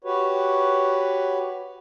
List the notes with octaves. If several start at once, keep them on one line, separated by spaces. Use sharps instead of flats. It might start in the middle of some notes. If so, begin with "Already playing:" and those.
F#4 G4 B4 C#5